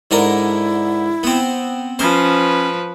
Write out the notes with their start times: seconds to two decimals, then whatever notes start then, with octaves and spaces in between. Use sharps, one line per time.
0.11 G#2 D3 E4 A#4
1.23 B3 C4
1.99 F3 C#4 B4 C5